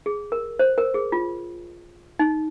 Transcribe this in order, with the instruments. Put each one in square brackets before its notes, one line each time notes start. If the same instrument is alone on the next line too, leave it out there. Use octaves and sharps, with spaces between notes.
[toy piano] G#4
A#4
C5
A#4
G#4
F4
D#4